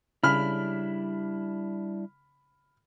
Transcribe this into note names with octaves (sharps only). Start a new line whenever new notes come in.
C#3 G3 D4 E4 B5 F6